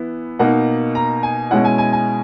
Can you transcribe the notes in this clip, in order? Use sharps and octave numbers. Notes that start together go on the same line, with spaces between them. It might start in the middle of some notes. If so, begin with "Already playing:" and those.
Already playing: E3 B3 E4
B2 A#3 D#4 F#5
A#5
G#5
B2 G#3 C#4 E4 F#5
G#5
G#5
G#5